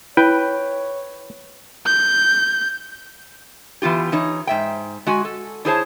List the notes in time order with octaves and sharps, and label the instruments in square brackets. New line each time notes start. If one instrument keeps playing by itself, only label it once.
[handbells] E4 [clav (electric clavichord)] B4 G5 [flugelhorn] C#5
[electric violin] G6
[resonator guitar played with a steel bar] E3 B3 F4 G4
E3 D#4 C#5
G#2 E5 G5
G#3 F#4 G#5
A4
D4 E4 G#4 C5 C#5 A5